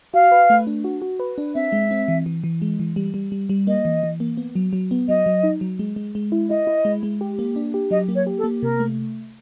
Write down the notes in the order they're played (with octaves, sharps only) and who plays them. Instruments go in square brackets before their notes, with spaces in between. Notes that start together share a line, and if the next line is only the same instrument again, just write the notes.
[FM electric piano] F#4 [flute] F5
[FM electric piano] B4
A3
D4
F#4
F#4
B4
D4
[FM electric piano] C4 [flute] E5
[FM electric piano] G#3
C4
E3
E3
E3
G#3
E3
G3
G3
G3
G3
[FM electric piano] A#3 [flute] D#5
[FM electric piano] E3
E3
A#3
B3
F#3
F#3
B3
[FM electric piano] F#3 [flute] D#5
[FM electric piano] F#3
D#4
F#3
G#3
G#3
G#3
E4
[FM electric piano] E4 [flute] D#5
[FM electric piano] E4
G#3
G#3
G4
A#3
D4
G4
[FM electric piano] F#3 [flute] D#5
[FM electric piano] A#3
[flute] C#5
[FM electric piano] G4
[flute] A4
[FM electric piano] A#3
[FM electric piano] C3 [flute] A#4
[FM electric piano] A3